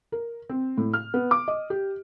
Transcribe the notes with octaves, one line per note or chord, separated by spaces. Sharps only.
A#4
C4
A2
F6
B3
D6
D#5
G4